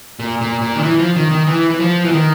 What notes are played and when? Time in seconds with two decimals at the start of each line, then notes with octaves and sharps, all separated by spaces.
0.19 A#2
0.41 A#2
0.62 A#2
0.76 D#3
0.83 E3
0.99 F3
1.16 D#3
1.31 D#3
1.47 E3
1.70 E3
1.80 F3
2.04 E3
2.12 D#3